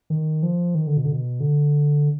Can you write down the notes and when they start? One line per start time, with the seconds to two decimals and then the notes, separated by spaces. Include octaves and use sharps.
0.10 D#3
0.43 F3
0.75 D#3
0.87 D3
0.97 B2
1.05 D3
1.12 B2
1.40 D3